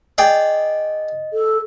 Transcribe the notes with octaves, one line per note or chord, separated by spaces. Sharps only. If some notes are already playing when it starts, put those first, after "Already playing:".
G#4 D5 D#5 G5
A4